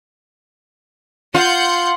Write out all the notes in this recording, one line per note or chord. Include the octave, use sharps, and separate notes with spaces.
F4 F#5 C6 G6